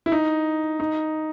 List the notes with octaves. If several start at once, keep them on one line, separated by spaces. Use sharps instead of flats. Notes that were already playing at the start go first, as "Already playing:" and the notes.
E4
D#4
D#4